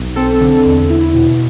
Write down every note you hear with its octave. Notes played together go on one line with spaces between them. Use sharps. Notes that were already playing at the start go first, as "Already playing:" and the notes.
Already playing: B1
C4 A4
D3
E2
E4
B2